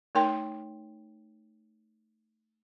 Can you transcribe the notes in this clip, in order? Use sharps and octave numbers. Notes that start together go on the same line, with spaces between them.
A3 D#4 A#4 C#5 G5 C6